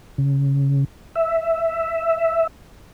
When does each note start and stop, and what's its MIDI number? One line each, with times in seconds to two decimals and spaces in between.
0.18 0.84 49
1.15 2.47 76